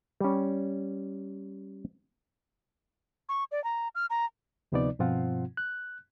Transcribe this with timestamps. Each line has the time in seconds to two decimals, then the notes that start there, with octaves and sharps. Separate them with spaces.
0.21 G3 C#4
3.29 C#6
3.52 D5
3.64 A#5
3.95 F6
4.10 A#5
4.72 D2 C3 F3 B3 D#4 D5
4.99 G2 B2 F3 C4 F4 F#5
5.57 F#6